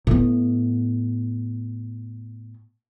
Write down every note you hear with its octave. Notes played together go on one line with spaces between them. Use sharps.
A2 B3